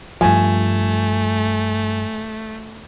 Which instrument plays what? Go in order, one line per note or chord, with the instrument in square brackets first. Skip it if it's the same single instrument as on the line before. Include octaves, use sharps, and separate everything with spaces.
[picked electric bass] G2 F3 [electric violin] A3 [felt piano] G#5